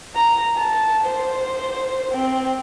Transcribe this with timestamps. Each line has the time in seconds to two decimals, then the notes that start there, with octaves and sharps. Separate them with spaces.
0.15 A#5
0.57 A5
1.04 C5
2.12 C4